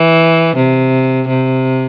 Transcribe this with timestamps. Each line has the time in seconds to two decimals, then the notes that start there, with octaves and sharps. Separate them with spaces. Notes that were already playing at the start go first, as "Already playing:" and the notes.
Already playing: E3
0.56 C3
1.28 C3